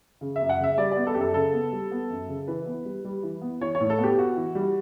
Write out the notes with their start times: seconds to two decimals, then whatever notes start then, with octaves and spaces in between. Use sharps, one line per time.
0.21 C#3
0.36 F#2 E5
0.49 F#5
0.59 C#3 E5
0.77 G3 D5
0.91 D5
0.96 B3
1.07 A4
1.15 F#2 G4
1.20 A4
1.34 C#3 A4
1.53 B3
1.72 G3
1.91 B3
2.10 F#2
2.29 C#3
2.48 E3 B4
2.66 B3
2.85 G3
3.05 G3
3.23 E3
3.42 B3
3.61 E3 C#5
3.75 C#5
3.80 A2
3.90 A4
3.98 B3
4.04 G4
4.17 B3 F#4
4.36 E3
4.55 G3